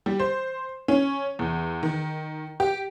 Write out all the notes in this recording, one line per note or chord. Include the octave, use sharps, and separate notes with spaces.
G3
C5
C#4
E2
D#3
G4